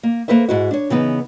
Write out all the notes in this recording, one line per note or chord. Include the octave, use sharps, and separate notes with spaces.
A#3
A#3 A4 B4 C5 E5
G#2 E4 F#4
D4 C#5
C#3 E3 B3 D#4